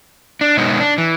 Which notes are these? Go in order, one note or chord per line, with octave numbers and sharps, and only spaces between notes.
D4
F#2 B2 G#3 B3 D#4 C#5
D4
E3